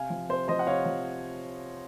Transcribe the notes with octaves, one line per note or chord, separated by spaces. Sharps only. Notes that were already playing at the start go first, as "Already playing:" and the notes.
Already playing: C3 F5 G#5
F3
C3 C5
F3 C5 D#5
F#5
C3 C#5 F5
F3